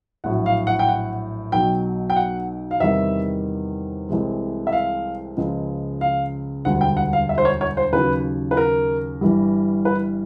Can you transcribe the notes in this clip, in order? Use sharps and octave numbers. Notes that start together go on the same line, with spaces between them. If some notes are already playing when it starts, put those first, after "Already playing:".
A#1 A2 F#3 F#5
F5
F#5
G5
F#5
B1 B2 F#3 G5
G5
F#5
F5
E2 C3 D#3 G3 E5
C2 C3 E3 G#3
E5
F5
C#2 C#3 F3 G#3
F5
E1 D2 D3 G3 F#5
G5
F#5
F5
E5
C5
C#5
C#5
C5
D#2 C#3 F#3 B4
B4
A#4
G1 G2 E3 G3
B4